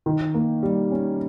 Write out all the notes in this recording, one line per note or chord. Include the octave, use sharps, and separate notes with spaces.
D#3
A#3
G3
C#4